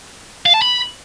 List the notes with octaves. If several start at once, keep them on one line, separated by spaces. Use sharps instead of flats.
F5
A5
B5